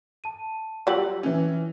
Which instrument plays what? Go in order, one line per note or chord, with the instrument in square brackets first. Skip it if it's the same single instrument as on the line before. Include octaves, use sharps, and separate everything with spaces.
[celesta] A5 D#7
[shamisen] F#3 G3 [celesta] F4 E6 F#7
[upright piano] E3 C#4